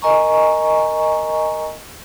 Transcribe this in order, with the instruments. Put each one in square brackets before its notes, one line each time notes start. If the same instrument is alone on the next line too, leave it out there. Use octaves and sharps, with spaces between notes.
[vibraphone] A#4 D#5 G#5 A#5 C#6